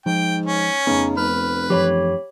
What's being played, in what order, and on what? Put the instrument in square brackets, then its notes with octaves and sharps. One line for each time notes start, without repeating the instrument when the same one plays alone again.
[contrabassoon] G#2 [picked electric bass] F3 [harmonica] G5
[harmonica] C#4
[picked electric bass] F2 A3 B3 [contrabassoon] C#3 [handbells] D#4
[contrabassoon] F1 [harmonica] B4 [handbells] F6
[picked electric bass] F#2 E3 F3 [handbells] G4 C#5 B5